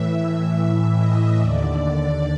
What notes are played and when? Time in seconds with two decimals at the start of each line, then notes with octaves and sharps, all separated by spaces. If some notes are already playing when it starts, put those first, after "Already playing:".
Already playing: A2 E3 E5
0.98 D#5
1.39 D#2 D3 D5
1.80 D5